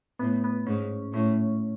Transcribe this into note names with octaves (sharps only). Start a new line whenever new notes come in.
A2 B3
B3
G#2 C#4
A2 C#4